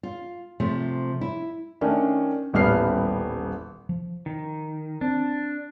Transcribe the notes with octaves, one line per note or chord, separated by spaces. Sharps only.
F4
C3 F3 A3
E4
D#3 A3 C#4 D4
D#1 A1 G3 B3 F6 C7
F3
D#3
C4 D4